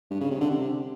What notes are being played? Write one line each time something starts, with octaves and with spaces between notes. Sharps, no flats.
G2
C#3
C3
D3
C3